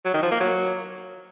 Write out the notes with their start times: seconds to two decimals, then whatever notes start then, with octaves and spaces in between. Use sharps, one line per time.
0.05 F#3
0.14 D#3
0.23 F3
0.31 A#3
0.40 F#3